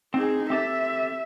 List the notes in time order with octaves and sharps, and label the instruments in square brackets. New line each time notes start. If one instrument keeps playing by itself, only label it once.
[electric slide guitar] C4 [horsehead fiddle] D#4 G#4
[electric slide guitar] C4 G4 A4 [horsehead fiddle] E5